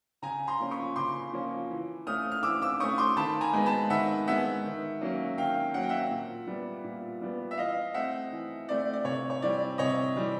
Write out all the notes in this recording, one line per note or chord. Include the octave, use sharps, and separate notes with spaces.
C#3 G#5 A#5
A#5 C6
F3 A#3 C#4
B5 C#6
C#3 C6 D6
F3 A#3 C#4
E3
A3 C#4 D#6 F6
F6
E3 D6 E6
D6 E6
A3 C#4 C#6 D#6
C6 D6
D#3 A5 B5
G#5 A#5
G#3 B3
A5 B5
D#3 E5 F#5
G#3 B3 E5 F#5
D#3
F#3 A#3 C#4
D#3 F5 G5
F#3 A#3 C#4 F#5
G5
E5 F#5
A#2
G3 B3
A#2
G3 B3
E5
E3 D#5 F5
A3 C4 E5 F#5
E3
A3 C4 D5
D5
C3 C#5
C#5
E3 G3 C4 D5
C3 C#5 D#5
E3 G3 C4